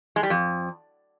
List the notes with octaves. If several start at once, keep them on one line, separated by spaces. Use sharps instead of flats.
G#3
G3
F2